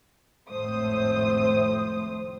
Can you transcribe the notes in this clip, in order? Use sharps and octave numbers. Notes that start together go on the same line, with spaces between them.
G#1 F2 A2 A3 C5 D#6